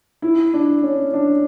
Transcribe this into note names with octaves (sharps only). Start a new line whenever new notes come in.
E4
D4
C#4
D4